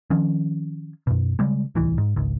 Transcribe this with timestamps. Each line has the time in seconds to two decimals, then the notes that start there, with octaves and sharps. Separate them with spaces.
0.10 D#3 F3 C#4
1.07 F#2 B2
1.39 C#3 G3 G#3
1.75 D1 C2 E3
1.98 G#2
2.16 G#1 C#2